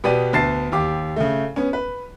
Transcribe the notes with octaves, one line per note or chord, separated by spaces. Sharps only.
B2 B3 G4 D5 D#7
D2 B3 A5 A6 C7
D#2 G4 D6
C#3 A3
B3 C#4
B4